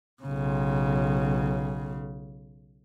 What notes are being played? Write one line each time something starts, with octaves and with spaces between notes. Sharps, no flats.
B1 C#3